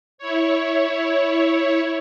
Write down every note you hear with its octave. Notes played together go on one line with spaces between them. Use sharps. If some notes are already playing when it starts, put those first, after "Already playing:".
E4 C#5